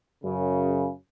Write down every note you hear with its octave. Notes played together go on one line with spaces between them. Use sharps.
F#2 C#3